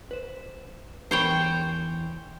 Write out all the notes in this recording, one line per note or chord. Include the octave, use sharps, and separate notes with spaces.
B4 C5
E2 A#4 C5 C#5 G5 B5